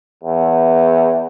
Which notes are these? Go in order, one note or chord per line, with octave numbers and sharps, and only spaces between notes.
E2